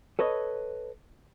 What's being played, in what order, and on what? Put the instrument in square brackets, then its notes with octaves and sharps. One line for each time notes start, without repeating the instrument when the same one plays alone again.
[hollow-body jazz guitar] A4 B4 C#5 D#5